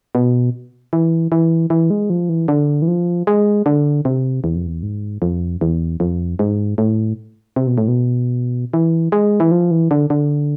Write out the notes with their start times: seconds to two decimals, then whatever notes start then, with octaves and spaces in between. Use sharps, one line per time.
0.15 B2
0.93 E3
1.32 E3
1.70 E3
1.90 G#3
2.10 F3
2.29 E3
2.48 D3
2.82 E3
2.88 F3
3.27 G#3
3.66 D3
4.05 C3
4.44 E2
4.56 F2
4.67 E2
4.83 G#2
5.22 F2
5.61 E2
6.00 F2
6.39 G#2
6.78 A2
7.56 C3
7.67 B2
7.78 A2
7.88 B2
8.74 E3
9.12 G#3
9.40 E3
9.51 F3
9.71 E3
9.91 D3
10.10 D3